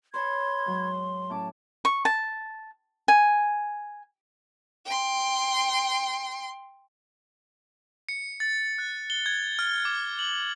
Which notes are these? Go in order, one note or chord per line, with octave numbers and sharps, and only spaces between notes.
B4 C#5 A5 B5 C6 G#6
G#2 F#3
A2 C#4 A5 D6
C#6
A5
G#5
G5 C6
C#7
A6
F#6
G7
G#6
F6
D6
F#7